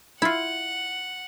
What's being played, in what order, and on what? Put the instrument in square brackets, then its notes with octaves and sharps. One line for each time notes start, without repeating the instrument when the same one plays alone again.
[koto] E4 F4 [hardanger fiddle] F#5